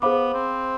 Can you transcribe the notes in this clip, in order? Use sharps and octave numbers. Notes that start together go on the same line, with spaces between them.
B3 G#4 C5 F5 B5 D6
C4